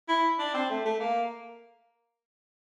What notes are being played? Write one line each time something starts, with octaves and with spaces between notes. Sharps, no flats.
E4
D4
C4
A3
A3
A#3